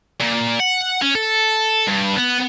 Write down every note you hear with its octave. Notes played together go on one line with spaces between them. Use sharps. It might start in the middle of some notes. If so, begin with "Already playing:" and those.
A#2
F#5
C#4
A4
G2
B3